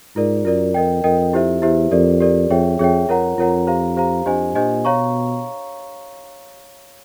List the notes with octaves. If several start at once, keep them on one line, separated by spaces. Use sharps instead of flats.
G#2 F4 A#4 D5
F#2 F4 A#4 D5
F2 A#4 D#5 G5
F2 A#4 D#5 G5
E4 G4 C5 E5
E2 E4 G4 C5 E5
F2 G4 A#4 D5
G4 A#4 D5
F2 G#4 C#5 E5 G5
F2 G#4 C#5 E5 G5
F2 F4 A#4 C#5 F#5 A#5
F2 F4 A#4 C#5 F#5 A#5
G4 C5 F5 A#5
G4 C5 F5 A#5
F2 D4 G4 C5 D#5 G#5
A#2 D4 G4 C5 D#5 G#5
B2 C#5 F5 A#5 C#6